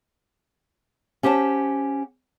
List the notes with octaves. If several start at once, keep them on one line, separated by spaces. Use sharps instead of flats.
C#4 G4 C5 F#5 A5